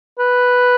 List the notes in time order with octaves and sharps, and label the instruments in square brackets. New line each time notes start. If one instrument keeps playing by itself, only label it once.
[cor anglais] B4